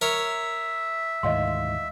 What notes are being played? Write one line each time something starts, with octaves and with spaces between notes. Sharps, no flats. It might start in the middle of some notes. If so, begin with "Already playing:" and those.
A#4 C#5 E5
D2 G#2 D#3 D#5 F5 C6